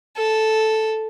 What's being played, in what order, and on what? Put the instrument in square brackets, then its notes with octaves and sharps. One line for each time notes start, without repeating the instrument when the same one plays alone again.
[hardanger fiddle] A4